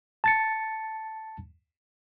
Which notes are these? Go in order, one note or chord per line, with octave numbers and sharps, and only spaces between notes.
A5 A6 C#7